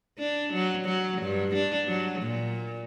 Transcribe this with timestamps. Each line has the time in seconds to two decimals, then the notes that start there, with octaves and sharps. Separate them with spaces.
0.19 D4
0.53 F#3
0.85 F#3
1.22 G2
1.55 D4
1.88 F#3
2.21 A#2